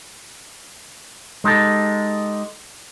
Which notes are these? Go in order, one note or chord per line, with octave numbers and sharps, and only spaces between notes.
G#3 D#4 G4 A4